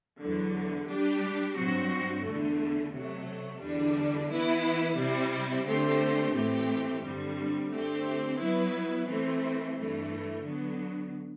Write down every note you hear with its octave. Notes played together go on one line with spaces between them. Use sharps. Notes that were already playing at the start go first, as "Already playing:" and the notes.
E2 D3 F#3
G3 D4 G4
G2 F#3 C4 F#4
E2 D3 A3
C3 F#3 A3
E2 D3 G3 D4
E3 B3 E4 B4
C3 G3 C4 E4
D3 A3 C4 G4 C5
A2 E3 A3 C4 G4
G2 D3 G3 C4
D3 A3 C4 G4
F#3 B3 E4 B4
E3 A3 C4
G2 E3 A3
D3 F#3 B3